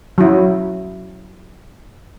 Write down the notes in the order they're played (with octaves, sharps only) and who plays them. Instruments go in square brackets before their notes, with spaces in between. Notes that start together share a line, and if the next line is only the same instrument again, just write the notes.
[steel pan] F#3 E4